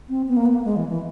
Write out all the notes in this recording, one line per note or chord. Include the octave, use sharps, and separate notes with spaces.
C4
B3
A#3
B3
A#3
G#3
E3
E3